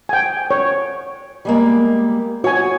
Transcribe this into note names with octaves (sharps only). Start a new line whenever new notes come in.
G5 G#5
C#5
G3 G#3 A#3
F#4 C#5 G#5